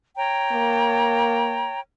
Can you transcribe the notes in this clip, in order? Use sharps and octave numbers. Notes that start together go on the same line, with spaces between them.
C#5 G5 A#5
A#3